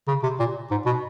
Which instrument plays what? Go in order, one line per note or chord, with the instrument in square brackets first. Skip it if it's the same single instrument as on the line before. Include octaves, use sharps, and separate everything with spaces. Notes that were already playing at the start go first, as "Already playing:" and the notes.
[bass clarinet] C#3
C3
A#2
G#2
B2